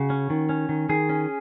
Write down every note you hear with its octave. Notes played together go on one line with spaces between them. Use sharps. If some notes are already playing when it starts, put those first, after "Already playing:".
Already playing: C#3 F#4
C#4
D#3
C#4
D#3
D#3 G#4
C#4